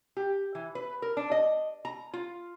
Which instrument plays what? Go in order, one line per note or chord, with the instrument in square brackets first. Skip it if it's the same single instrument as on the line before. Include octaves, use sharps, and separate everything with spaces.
[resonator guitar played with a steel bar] G4
E3
B4
A#4
D4
D#5
A#5
F4